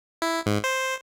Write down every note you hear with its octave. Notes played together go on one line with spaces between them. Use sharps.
E4
G#2
C5